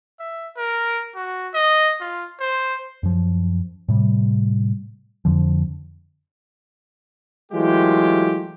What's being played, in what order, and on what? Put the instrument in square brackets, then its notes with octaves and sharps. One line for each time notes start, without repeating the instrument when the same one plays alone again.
[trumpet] E5
A#4
F#4
D#5
F4
C5
[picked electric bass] F#2 F3
A2 C3 G3
F2 D3 F3
[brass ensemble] E3 F#3 G#3 A3 F4 G4